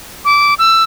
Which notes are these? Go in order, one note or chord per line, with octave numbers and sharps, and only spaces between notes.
D6
E6